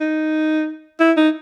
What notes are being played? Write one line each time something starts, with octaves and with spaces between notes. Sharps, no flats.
D#4
E4
D#4